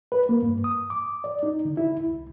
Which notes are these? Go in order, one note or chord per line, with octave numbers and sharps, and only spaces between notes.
B4
A#3
G2
D#6
D6
D5
D#4
D3
E4
C2